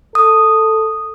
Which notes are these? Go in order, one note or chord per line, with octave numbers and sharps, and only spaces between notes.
A4 D#6